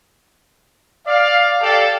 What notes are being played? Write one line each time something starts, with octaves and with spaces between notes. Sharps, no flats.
D5 F5
G4 A4 D5 F5 A5